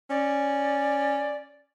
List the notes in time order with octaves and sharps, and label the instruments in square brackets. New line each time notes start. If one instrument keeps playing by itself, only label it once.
[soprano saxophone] C#4 [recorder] D5